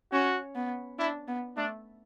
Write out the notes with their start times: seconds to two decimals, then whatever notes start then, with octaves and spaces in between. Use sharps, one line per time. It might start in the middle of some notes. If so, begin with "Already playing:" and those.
0.12 C#4 F#4
0.56 B3
0.99 D4 E4
1.28 B3
1.57 A3 D4